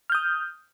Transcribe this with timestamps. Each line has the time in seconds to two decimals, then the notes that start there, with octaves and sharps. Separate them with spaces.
0.10 F6
0.12 G6
0.15 D#6